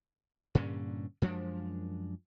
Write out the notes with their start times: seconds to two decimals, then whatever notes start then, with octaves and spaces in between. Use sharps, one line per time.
0.55 G2 A#2 D3 C#4
1.22 F#2 F3 G#3 D4